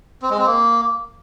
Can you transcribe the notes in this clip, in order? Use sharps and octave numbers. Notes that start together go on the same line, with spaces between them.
C4
G#3
C4
A#3